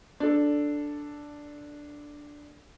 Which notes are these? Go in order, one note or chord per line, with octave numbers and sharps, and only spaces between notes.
D4 A4